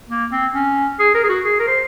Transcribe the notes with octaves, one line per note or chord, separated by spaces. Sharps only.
A#3
C4
C#4
G#4
A#4
G#4
F#4
G#4
A#4
C5